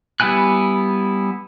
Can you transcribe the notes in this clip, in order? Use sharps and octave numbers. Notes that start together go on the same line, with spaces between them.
G3 B3 E4 G#5 F#6